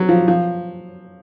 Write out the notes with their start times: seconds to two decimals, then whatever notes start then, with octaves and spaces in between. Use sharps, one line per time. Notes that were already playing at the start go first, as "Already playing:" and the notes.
Already playing: F#3
0.09 F3
0.28 F3